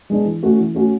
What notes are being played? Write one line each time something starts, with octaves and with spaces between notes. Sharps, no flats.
G#3 B3 D4
E3
A3 C#4 F#4
E3
A3 C#4 F#4